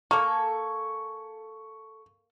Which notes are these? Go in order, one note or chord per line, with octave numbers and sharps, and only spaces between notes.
A#3 A4 G#5 C#6